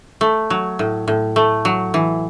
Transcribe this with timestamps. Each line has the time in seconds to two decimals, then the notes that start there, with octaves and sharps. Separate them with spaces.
0.21 A3
0.50 F#3
0.79 A2
1.08 A2
1.36 A3
1.65 F#3
1.94 E3